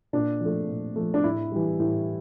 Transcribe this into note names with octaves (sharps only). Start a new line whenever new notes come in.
A#2 D4
F3 A3
A#2
F3 A3
D4
A2 E4
E3 G3
A2